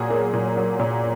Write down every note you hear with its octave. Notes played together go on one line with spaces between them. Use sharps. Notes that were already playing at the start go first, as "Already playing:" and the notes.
Already playing: A#2 F#3 G#4
A#3
A#2
F#3
A#2